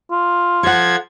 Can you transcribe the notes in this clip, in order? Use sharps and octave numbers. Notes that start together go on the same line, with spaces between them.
F4
F3 A4 F#5 G#6